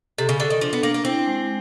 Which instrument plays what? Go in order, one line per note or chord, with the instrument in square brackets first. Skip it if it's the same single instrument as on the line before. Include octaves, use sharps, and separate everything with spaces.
[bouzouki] C3 [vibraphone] A4
[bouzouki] C#3
[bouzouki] D3 [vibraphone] A4
[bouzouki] D#3
[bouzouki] F3 [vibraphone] D4
[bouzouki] B3
[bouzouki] A#3 [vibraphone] D4
[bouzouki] A#3
[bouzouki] C4 [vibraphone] E4
[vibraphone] G#3